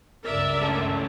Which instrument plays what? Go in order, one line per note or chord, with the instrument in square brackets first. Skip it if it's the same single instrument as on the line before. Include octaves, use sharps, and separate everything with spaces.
[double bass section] G1 C#2 G2 [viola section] A#4 D5 E5
[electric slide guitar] A3 C#4 A4